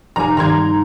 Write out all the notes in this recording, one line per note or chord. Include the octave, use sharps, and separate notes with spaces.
F1 D4 G#5 A#5
G2 D#3 A#5 C6 G#6